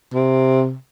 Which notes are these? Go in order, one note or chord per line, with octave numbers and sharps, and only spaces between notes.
C3